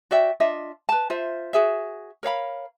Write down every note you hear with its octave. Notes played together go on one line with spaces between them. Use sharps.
F#4 D5 E5 G5
D4 F4 D#5 E5
B4 A5
F4 C5 E5
F#4 G#4 E5
A#4 C#5 F5 B5